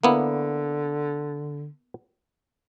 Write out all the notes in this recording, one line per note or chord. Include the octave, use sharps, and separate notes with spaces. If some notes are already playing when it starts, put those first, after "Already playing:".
D3 A#3 B3 E4